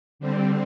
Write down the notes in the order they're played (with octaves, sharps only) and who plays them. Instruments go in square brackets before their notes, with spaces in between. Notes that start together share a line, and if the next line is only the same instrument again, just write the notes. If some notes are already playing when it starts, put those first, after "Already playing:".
[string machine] D3 G3 C4